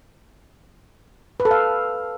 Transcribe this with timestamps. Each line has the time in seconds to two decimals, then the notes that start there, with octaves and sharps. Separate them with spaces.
1.40 B4
1.45 A4
1.51 F5